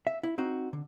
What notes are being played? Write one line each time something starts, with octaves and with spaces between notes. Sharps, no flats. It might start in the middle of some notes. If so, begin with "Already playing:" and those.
E5
E4
C4 D#4 F#4
D3